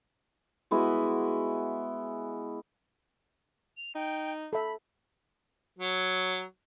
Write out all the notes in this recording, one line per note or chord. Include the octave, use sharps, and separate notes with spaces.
G#3 B3 E4 F#4
F7
D#4 G5
A4 E5 B5
F#3